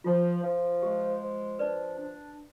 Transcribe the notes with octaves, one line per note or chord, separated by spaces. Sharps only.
F3 F4
F3
G#3 G4
F3
D4 B4 D5
D4